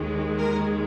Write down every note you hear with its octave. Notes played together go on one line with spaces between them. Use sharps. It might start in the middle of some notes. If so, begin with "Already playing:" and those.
Already playing: D#2 D#3 G#3
A#4